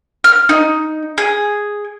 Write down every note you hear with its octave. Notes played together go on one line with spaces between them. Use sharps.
F6
D#4
G#4